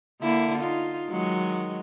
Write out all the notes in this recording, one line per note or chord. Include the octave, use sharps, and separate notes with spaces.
D3 A#3 E4
D#4 F4
D#3 F#3 G#3